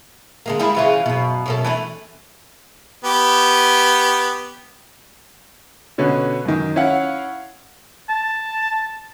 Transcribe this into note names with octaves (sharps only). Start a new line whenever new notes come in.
D3 G#3 A#3
G3 G#3 E4
C#3 E3 F4
F#2 B2
F#2 B2 A4
E3 A3 D4
B3 G4
B2 D3 C#4 B4
F#2 D#3
C#4 E4 C#5 F5 F#5
A5